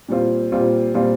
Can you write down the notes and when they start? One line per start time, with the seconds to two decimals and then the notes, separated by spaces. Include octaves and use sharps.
0.08 A#2 G3 C4 F4
0.52 A#2 G3 C4 F4
0.94 A#2 G3 C4 F4